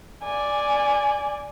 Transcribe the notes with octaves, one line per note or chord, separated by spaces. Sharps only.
D5 G#5